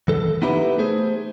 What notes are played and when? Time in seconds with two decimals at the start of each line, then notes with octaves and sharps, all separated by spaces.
0.08 E3 A4
0.42 B3 D#4 E4 G4 B4
0.78 A3 G#4 C5